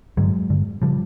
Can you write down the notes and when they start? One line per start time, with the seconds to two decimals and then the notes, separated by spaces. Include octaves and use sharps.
0.17 G2 D3 F#3 G#3
0.50 G2 D3
0.82 C#3 F3 G3